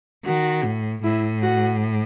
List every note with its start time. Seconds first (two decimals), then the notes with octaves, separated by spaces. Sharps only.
0.25 D#3 F#4
0.65 A2
1.03 A2 E4
1.42 F#4